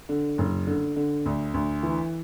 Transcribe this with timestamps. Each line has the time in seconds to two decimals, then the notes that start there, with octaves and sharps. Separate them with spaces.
0.09 D3
0.38 F#1
0.67 D3
0.96 D3
1.26 D2
1.54 D2
1.83 E3